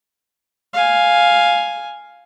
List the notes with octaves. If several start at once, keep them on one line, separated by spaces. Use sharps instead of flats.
F5 G#5